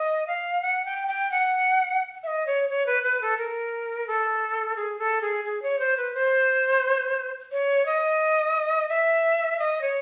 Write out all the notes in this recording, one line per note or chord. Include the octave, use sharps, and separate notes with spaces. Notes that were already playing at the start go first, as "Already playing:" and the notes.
Already playing: D#5
F5
F#5
G5
G5
F#5
E5
D#5
C#5
C#5
B4
B4
A4
A#4
A4
G#4
A4
G#4
G#4
C#5
C5
B4
C5
C#5
D#5
E5
D#5
C#5